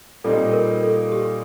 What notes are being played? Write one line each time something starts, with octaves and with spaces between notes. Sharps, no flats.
A#2 G3 C4 D#4 A4
A#4
A4
G4